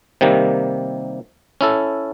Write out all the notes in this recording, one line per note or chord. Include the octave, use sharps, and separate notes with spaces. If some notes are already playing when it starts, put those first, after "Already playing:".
C3 D#3 G3 A#3
C#4 E4 A4